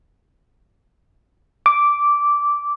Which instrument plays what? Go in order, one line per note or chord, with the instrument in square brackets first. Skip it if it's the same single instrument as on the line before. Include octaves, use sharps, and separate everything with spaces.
[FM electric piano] D6